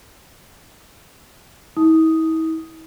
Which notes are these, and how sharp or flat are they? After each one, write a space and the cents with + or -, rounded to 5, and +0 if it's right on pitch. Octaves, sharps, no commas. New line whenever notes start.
E4 -45 D#6 +0